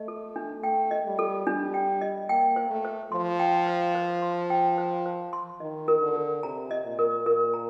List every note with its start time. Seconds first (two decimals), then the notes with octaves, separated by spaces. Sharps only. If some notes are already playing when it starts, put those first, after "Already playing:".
Already playing: A3 D#5
0.08 A4
0.36 D4
0.63 A3 G5
0.91 D#5
1.05 G3
1.19 A4
1.47 G3 D4
1.74 G5
2.01 D#5
2.29 A#3 G5
2.56 C5
2.70 A3
2.85 C5
3.12 F3 C6
3.39 G5
3.67 C5
3.95 C5
4.22 C6
4.50 G5
4.78 C5
5.06 C5
5.33 C6
5.60 D#3 D#5
5.88 A#4
6.02 D3
6.16 A#4
6.43 C3 A#5
6.71 D#5
6.85 A#2
6.99 A#4
7.26 A#2 A#4
7.54 A#5